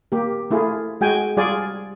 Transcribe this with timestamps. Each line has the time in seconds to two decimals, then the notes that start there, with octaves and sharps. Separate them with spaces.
0.12 A#3 G4
0.51 A3 E4 F4 G#4
1.01 G#3 F#4 G5 G#5
1.37 G3 F4 G#4 D5 G#5